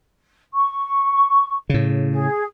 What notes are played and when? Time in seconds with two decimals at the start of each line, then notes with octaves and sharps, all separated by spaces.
0.54 C#6
1.69 A2 C#3
2.12 G#4